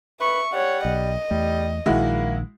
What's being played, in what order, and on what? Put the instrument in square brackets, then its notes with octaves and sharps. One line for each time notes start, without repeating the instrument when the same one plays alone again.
[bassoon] B4 [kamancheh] E5 C#6
[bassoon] G3 [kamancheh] C#5 F#5
[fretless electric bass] B1 [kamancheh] D#5
[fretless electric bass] E2 A3 [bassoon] G3
[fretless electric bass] A#1 D#3 [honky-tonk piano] G#3 E4 F#4 [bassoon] A#3